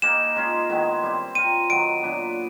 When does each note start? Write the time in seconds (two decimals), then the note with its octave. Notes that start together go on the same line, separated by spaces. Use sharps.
0.02 A#3 D#4 G#4 B4 E7
0.36 G#3 C#4 F4
0.69 D#3 G#3 B3 E4
1.03 G3 C4 E4
1.35 C4 F4 A#4 D#7
1.69 D#3 F#3 B3 D7
2.03 A#2 F#3 B3 D4